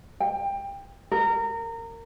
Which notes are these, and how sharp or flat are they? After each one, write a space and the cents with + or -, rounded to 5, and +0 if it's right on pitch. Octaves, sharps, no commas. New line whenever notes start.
G5 +20
A#4 -25